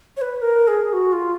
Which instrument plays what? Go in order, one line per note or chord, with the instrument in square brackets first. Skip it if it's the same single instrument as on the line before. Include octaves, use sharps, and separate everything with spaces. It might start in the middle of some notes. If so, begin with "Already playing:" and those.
[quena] C#5
B4
A#4
G#4
F#4
F4